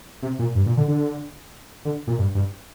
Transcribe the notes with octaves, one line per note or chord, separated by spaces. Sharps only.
C3
A#2
G2
A#2
D3
D3
D3
A#2
G2
G2